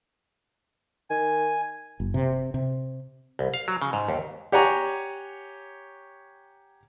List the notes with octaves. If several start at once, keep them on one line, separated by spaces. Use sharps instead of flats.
D#3 G#5
F#1
C3
C3
C2
F5
F#3
C#3
G#2
D#2
G4 C#5 F#5 G#5 A#5 C#6